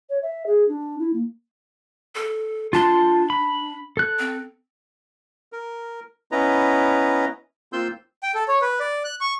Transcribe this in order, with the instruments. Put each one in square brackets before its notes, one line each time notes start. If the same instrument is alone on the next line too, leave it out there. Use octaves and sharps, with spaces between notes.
[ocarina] C#5
E5
G#4
D4
E4
A#3
[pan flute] A4
[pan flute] D4 [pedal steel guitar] F4 A5 C6
[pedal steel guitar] B5
A4 F#6
[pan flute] C4
[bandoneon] A#4
B3 C#4 E4 B4 D#5 A#5
A#3 C4 F4 C6 E6 G6
[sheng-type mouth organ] G5
A4
C#5
B4
D5
F#6
C#6